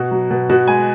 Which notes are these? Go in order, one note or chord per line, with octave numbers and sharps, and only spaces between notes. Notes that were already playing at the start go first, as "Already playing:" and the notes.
Already playing: B2 F#4
F#3
B2
B2 F#4
G#3 G#5